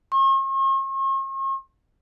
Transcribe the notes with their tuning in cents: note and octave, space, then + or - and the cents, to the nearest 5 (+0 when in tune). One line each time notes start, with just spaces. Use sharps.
C#6 -45